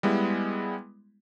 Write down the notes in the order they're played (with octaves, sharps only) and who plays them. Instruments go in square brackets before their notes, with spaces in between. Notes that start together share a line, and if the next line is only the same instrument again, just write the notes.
[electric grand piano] G3 G#3 B3 E4